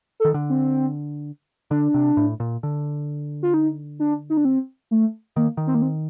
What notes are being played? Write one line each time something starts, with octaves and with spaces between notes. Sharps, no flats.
A4
D#3
D3
C4
D3 D4
C3
A2
A#2
D3
F4
D#4
D4
D#4
D4
C4
A3
D#3 A#3
D#3
C4
A#3
C4